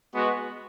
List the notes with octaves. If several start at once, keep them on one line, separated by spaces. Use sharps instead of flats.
G#3 B3 F#4